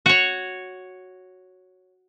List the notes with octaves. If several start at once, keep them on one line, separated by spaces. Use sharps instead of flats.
F#4 C#5